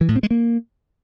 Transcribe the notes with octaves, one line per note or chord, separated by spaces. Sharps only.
E3
A2
C4
G#3
A#3